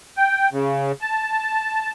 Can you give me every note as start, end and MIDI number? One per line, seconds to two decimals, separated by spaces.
0.17 0.49 79
0.52 0.92 49
1.01 1.92 81